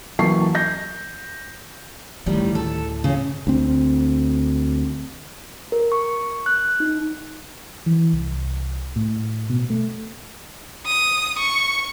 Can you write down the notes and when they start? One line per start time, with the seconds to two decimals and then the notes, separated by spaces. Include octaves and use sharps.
0.19 E3 F#3 A#3 A5 C#6 C7
0.55 G6 A#6
2.26 D2 A2 D#3 G3
2.55 A4
3.04 C#3 C#4
3.47 D2 C4
5.72 A#4
5.92 C#6
6.46 F#6
6.80 D#4
7.86 E3
8.13 C2
8.96 A2
9.50 B2
9.70 A3
10.86 D#6
11.39 C#6